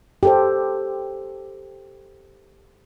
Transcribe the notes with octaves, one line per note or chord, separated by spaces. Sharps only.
G4 A4 C5